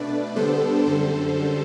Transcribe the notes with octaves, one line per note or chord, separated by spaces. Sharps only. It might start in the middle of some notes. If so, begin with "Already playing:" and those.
Already playing: B2 A3 D4 B4 D5
D3 G3 B3 D4 A4 C5
F#2 D3 G3 A4 C5